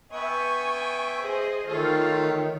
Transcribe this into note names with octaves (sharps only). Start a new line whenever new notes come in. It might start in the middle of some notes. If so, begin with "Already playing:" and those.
B3 E5 G5 G#5 C#6
G#4 C5 D#5
D#3 A3 F4 A4 C#5